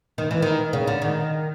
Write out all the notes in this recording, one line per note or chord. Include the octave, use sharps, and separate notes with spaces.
D#3
E3
D#3
C#3
D3
D#3